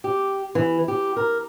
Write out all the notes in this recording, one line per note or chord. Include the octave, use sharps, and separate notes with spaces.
G4
E3
G4
A#4